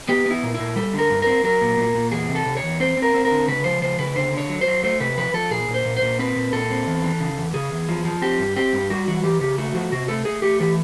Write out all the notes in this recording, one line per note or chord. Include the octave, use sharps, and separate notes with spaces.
B3 G4
B3 E4
A#2
E4
A#2
G3 A4
D3 A#4
G2
C4 A#4
F#3 A#4
A#2
A#2
A#2
E2 G#4
C3
A4
C3
C#5
E2
C4 C5
C4
A#4
C4
A#4
D3
C#3 B4
F3 C5
C#3 C5
C#3 B4
D3 C5
D3 C#5
F#3
C5
F#3
A3 C5
C3 B4
F3 B4
F3 A4
A#2 G#4
A#2
C5
A#2
A#2 C5
C4 B4
A#2
A#2 A4
C4
E2
E3
C#3
E2
C#3 G#4
E2
F3
F3
C4 G4
G2
C4 G4
G2
G3 F#4
E3 F#4
E3 G4
C#3 G4
A3 F#4
F3 F#4
C3 F#4
A3 A4
A3 G#4
A3 G4
E3 G4